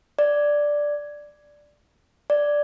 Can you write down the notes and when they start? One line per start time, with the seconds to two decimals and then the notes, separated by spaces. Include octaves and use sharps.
0.19 D5
2.30 D5